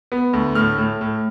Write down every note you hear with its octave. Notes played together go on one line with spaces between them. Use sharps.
B3
D2
A2 F6
A2
A2